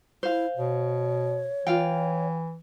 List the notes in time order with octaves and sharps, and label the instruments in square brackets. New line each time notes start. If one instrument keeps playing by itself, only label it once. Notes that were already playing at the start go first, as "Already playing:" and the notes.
[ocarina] E4 [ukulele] C5 F5
[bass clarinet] B2 [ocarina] C#5
[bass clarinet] E3 [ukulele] F4 F5 G5